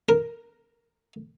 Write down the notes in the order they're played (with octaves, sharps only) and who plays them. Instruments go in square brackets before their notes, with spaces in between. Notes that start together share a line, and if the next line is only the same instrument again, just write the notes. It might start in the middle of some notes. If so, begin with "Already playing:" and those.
[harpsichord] A#4